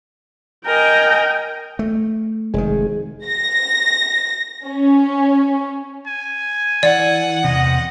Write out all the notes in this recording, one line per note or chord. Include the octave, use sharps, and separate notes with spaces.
A#4 D#5 G5 G#5
A3
F1 D#3 G#3 G#4
A#6
C#4
G#5
E3 D5 F#5
E2 C3 D#5